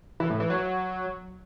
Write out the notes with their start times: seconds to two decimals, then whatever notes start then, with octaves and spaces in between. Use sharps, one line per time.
0.20 E3
0.30 A2
0.40 E3
0.50 F#3